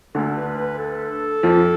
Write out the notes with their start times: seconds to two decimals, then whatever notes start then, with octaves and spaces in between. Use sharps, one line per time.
0.15 D2 D3 A4
0.37 B4
0.57 B4
0.79 A4
1.43 F2 F3